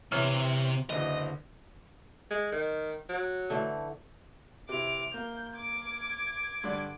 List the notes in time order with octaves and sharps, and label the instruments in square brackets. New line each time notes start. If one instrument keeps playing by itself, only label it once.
[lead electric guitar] C3 [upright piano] E3 C#5 F6
[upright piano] F#1 D3 E3 [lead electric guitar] D#5
[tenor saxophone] G#3
D#3
F#3
[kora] D3 E3 A3
[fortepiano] C3 E4 [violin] D6 F7
[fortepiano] A#3 [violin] G6
[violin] D6 G#6
[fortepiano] G2 D3 D5